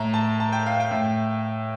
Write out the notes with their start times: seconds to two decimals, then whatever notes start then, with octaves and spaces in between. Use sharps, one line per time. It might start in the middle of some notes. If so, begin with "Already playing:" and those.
Already playing: A2 A#5
0.14 A5
0.40 A5
0.52 G5
0.66 F5
0.80 G5
0.91 A2